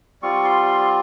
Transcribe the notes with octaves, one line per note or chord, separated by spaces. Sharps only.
G3 C4 F4 C#6
C6
C6
C6